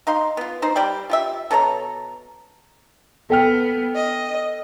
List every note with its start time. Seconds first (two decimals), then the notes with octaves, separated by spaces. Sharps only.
0.07 D#4 F5 C6
0.37 B3 F4
0.62 D#4 C5
0.76 G3 D5 G5 B5
1.10 F4 G4 E5
1.51 B2 A4 C#5 A#5
3.30 B3 A4 G5 F6
3.96 D#5